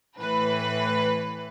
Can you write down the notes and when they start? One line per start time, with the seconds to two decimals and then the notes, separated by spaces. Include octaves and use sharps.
0.18 A2 E3 B4